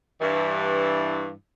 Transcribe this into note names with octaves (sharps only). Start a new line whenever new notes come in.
G2 E3